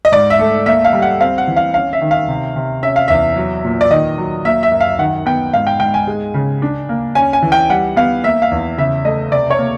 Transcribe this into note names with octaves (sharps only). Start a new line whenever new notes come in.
D#5
G#2 D5
E5
A3
A#3 E5
F5
G3
F#5
C4 F5
F#5
E3
F5
C#4 F5
E5
D#3
F5
C3
C3
C#4 E5
F5
E2 E5
F#3
A#2
D5
D#3 D#5
F#3
A#3 E5
E5
F#2
F5
D#3 F#5
B3 G5
G#2 F5
G5
G#2 G5
G#5
G#3
C#3
D4
A#3
C#4 G#5
G#5
E3
G5
G3 F#5
B3 F5
A#3 E5
F5
E2
C#3 E5
A3 D#5
C3 D5
C#5
A#3